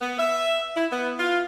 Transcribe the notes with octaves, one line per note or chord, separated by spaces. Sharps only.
B3
E5
E4
B3
F4